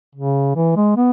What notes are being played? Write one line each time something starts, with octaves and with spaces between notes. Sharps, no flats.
C#3
E3
G#3
B3